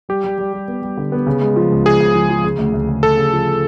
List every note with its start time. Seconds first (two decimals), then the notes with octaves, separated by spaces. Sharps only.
0.09 G3 G4
0.24 G3
0.38 G3
0.53 G3
0.68 B3
0.82 G3
0.97 D3
1.12 B3
1.27 C#3
1.41 G#3
1.56 F3
1.70 C#2
1.85 F3 G#4
2.00 C#3
2.14 F3
2.29 F3
2.44 C#3
2.58 D2
2.74 D2
2.88 C#3
3.03 D2 A4
3.17 C#3
3.32 F3